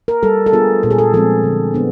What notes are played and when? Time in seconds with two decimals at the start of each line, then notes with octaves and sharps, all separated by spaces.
0.08 A#4
0.23 G3 A4
0.46 A4
0.53 B3 D4 F4 G#4
0.83 A#2 A4
0.91 G#4
0.98 A4
1.13 F3 G#3 C4 A4
1.44 D3
1.74 B3 D4